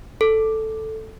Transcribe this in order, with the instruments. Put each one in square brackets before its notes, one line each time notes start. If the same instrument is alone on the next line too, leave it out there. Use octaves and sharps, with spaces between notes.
[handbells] A4